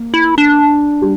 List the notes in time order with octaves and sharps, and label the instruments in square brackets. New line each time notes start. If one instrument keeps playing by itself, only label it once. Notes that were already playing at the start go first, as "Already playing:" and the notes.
Already playing: [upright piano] A#3
[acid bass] E4
D4
[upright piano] G3